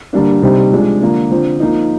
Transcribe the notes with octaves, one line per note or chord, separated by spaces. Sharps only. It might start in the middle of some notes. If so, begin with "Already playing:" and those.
D3 G3 A#3 D4
C3 G3 C4 D#4
F3 G#3 D4
D3 F3 A#3 D4
D3 F3 C4
F3 A#3 D#4